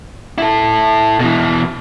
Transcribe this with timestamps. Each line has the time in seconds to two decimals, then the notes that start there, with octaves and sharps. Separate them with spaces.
0.38 E4 A4
1.20 B2 E3